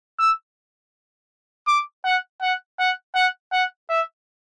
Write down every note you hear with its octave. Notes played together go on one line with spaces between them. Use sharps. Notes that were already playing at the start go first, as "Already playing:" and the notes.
E6
D6
F#5
F#5
F#5
F#5
F#5
E5